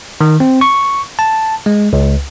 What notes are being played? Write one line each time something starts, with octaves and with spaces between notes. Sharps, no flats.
D#3
C4
C#6
A5
G#3
C#2